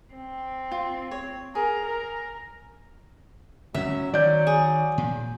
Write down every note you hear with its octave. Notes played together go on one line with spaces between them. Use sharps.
C4
F4
C#5
G#4 A#4
A#4
G1 A2 F#3 C#4 E5
D#3 F#3 D5 G6
G#4
A#2